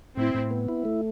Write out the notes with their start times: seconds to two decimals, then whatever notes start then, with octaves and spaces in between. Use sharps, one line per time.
0.17 A2 C4 E4
0.35 A2
0.51 B3
0.69 E4
0.85 A3